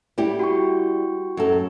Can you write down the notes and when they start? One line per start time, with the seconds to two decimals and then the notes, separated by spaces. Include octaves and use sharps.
0.18 G3 E4 G4
0.39 F#4 G5 C#6
1.37 F#2 A4